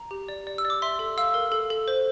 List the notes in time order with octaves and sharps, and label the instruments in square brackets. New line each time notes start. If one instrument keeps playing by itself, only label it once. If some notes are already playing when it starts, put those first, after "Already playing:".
Already playing: [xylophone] A#5
G4
D5
D5
E6
D5
D6
E5 C6
A4
F5 E6
A#4
A4
A4
C5